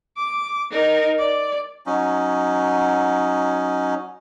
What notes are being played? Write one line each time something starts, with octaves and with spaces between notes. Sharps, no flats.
D6
D#4 A#4
D5
F#3 C#4 D#4